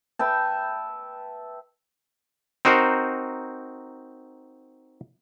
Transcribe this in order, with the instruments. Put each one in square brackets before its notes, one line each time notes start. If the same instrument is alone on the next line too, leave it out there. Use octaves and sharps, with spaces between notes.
[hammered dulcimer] B4 E5 G5 A5
[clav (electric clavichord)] C4 D#4 F#4 A#4 C5